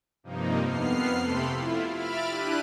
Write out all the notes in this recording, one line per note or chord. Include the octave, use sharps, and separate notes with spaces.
G2 C3 F3 A#3 D#4
F2 B3 F6 C7
C3 A3 G4 A4 B5 C6
E4 F4
E5 B5 F6 A6 D7
D4 E4 G4 F#6 D#7